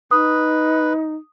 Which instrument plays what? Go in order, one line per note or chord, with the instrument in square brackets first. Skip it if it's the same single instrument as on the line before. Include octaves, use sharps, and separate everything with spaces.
[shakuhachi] D#4 [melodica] B4 [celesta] D#6